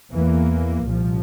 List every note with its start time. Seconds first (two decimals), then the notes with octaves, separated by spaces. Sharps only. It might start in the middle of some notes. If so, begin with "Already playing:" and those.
0.13 E2 E3 A#3
0.85 C2 A#2 F3